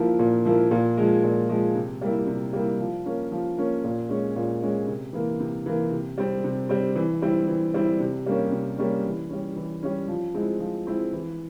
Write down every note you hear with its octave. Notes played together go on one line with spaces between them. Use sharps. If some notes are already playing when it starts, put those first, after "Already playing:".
Already playing: F3 A#3 E4
A#2
F3 A#3 E4
A#2
F3 G#3
A#2
F3 G#3
C3
G3 A#3 E4
C3
G3 A#3 E4
F3
A#3 C#4
F3
A#3 C#4
A#2
G#3 C#4
A#2
G#3 C#4
C3
E3 A#3
C3
E3 A#3
C3
G3 C4
C3
G3 C4
E3
G3 C4 E4
E3
G3 C4 E4
C3
G3 A#3 C#4
C3
G3 A#3 C#4
E3
G3 C#4
E3
G3 C#4
F3
G#3 C4 E4
F3
G#3 C4 E4
E3